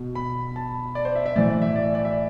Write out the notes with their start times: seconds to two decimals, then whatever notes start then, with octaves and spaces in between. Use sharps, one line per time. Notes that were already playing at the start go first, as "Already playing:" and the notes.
Already playing: B2
0.15 B5
0.56 A5
0.95 D5
1.05 C5
1.15 E5
1.26 E5
1.36 A2 E3 D5
1.48 D5
1.62 E5
1.76 D5
1.95 D5
2.05 E5